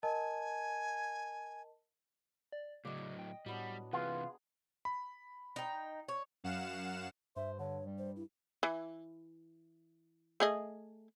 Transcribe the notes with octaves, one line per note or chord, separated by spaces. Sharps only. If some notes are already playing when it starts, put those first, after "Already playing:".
A#4 D#5 G#5 A5
D5
A2 C#3 F#3 D5 D#5
D#5
G5
A2 F#3 G3 B3 D4
C3 E3 F4 G#4 B4
B5
D#4 G5
C#5
F#2 F5 F#5 E7
G2 C5 E5
D3 C#5
G3
C5
E4
E3
A3 G#4 D#5